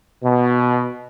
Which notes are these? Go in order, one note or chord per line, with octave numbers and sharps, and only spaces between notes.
B2